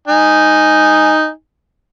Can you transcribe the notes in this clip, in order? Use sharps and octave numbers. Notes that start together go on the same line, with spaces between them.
D#4 G#5